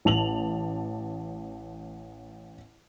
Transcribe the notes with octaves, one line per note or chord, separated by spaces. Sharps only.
A1 A5 F7 F#7